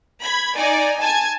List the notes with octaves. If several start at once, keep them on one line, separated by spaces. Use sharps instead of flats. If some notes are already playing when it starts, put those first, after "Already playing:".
B5 G#6
D#4 D5 G#5
G#5 A5 G#6